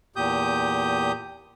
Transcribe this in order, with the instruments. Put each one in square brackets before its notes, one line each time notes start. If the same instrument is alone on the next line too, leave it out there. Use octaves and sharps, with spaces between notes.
[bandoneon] E2 A#2 G4 D#6 G6